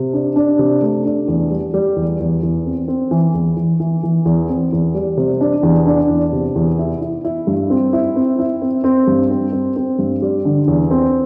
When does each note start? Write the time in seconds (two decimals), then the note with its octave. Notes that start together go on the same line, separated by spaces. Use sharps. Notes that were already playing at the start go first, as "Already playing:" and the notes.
Already playing: C3
0.13 D4
0.36 D4
0.59 C3
0.82 A3
1.05 D4
1.28 E2
1.51 G3
1.74 G3
1.96 E2
2.20 E2
2.43 E2
2.66 C4
2.88 C4
3.11 E3
3.34 E2
3.57 E3
3.80 E3
4.03 E3
4.25 E2
4.49 C4
4.72 E2
4.94 G3
5.17 C3
5.41 D4
5.63 E2
5.86 D4
6.09 E2
6.33 C3
6.56 E2
6.79 E4
7.01 E4
7.24 E4
7.47 G2
7.70 C4
7.93 E4
8.16 C4
8.39 E4
8.62 C4
8.84 C4
9.07 G2
9.31 C4
9.53 C4
9.76 C4
9.99 G2
10.22 G3
10.45 D3
10.67 E2
10.91 C4